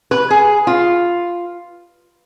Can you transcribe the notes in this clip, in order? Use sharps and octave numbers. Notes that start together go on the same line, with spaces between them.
B4
G#4
F4